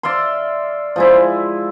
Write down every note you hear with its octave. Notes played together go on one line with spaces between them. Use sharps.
D5 E5 F5 C6
F3 G#3 E4